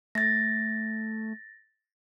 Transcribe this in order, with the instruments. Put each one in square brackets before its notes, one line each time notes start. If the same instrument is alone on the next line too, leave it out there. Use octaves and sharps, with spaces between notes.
[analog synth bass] A3 [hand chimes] A6 A#6